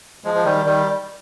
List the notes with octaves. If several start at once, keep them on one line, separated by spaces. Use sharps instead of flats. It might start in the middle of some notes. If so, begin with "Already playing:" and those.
F3 G#3
F3
D#3 G3
D#3 G3